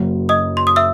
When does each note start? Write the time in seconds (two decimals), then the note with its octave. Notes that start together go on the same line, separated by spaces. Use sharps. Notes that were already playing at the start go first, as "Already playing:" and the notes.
Already playing: F#1 F#2 F#3
0.29 D#5 D#6
0.57 C6
0.67 D#6
0.76 E5 E6